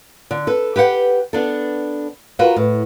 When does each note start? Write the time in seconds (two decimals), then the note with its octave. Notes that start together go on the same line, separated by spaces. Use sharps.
0.31 D3
0.47 A4 B4
0.76 G4 B4 C#5 F#5 G5
1.33 B3 D4 A4
2.39 F4 F#4 A#4 B4
2.56 A2